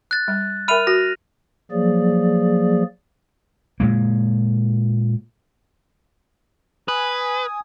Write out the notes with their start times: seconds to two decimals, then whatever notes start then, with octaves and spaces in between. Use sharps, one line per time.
0.11 F#6 A6
0.28 G3
0.68 A#4 E5 B5 F6 D#7 F7
0.87 F#4 A#6
1.71 F3 F#3 A#3 G#4 D5
3.80 A#2 G#3 A#3
6.88 B4 G#5 D#6